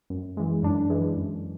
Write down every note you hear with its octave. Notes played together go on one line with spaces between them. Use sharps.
F#2
E3 G#3
F#2 D4
E3 G#3
F#2